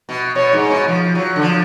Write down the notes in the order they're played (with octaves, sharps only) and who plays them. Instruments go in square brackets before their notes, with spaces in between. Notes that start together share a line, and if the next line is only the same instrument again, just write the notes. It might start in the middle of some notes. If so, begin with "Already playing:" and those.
[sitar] B2
[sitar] B2 [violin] C#5
[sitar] G#2
B2
F3
F#3
D3
F3